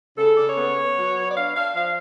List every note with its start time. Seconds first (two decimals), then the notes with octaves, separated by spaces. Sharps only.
0.16 C#3 A4
0.36 C#3 D5
0.46 C#5
0.56 B3
0.76 B3
0.95 F#3
1.15 B3
1.27 D5
1.34 D4 F5
1.53 D4 F5
1.74 F3 F5